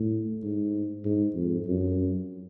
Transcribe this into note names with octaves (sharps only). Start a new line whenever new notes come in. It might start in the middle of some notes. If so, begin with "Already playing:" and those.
Already playing: A2
G#2
G#2
F2
F#2